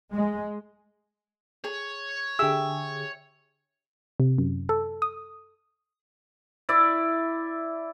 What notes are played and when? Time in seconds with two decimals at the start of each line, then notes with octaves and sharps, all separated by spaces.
0.13 G#3
1.64 G#4 C#5
2.39 D3 G4 G#4 E5 G5 E6
4.20 C3
4.38 F#2
4.69 A4
5.02 D#6
6.69 E4 D5 E5